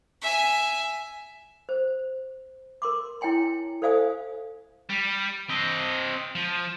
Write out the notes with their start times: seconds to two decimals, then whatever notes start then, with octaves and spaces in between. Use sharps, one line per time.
0.22 E5 G#5
1.69 C5
2.82 A#4 C6 D6
3.21 E4 C#5 G5 G#5 C6
3.82 A4 C5 D5 F5 G#5 D#6
4.89 G3
5.50 C4 D#5
6.35 F3